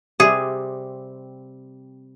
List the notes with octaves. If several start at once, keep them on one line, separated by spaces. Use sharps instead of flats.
C3 G3 C4 G#4